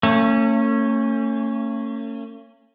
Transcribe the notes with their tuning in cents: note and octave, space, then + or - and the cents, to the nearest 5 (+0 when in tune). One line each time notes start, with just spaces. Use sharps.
A3 +45 C#4 -10